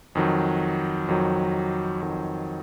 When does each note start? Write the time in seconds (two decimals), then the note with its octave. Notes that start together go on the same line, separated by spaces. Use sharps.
0.15 F2 D#3 F#3
1.08 F2 D#3 F#3
2.01 F2 D#3 F#3